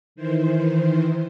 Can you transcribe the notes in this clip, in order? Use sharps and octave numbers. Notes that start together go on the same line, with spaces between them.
D#3 E3 C5